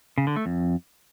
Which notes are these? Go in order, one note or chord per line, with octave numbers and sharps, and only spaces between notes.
C#3
D3
A3
F2